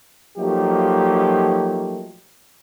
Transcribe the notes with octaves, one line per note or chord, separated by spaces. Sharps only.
F3 F#3 A3 A#3 D#4 G4